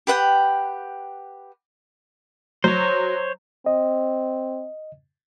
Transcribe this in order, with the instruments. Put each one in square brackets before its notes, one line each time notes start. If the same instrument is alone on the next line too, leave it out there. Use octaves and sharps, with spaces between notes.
[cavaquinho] G4 B4 F#5 G5
[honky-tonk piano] F#3 [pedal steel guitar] C5 C#5
[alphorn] C4 [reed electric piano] D#5